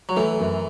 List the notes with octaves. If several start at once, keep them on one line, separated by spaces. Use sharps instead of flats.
F#3
E3 A3
F#2